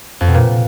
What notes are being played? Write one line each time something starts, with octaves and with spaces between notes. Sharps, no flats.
F2
B2
A#2